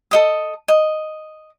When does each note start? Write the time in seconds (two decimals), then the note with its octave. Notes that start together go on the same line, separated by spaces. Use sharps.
0.11 A4 D#5 D#6
0.68 D#5